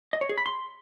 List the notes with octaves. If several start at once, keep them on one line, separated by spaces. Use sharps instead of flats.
D#5
C#5
G#4
B5
C6